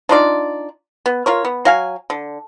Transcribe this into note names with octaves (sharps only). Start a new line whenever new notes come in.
D4 D#4 F4 D5
B3
F4 A#4 C#5
B3
F#3 F5 G#5
D3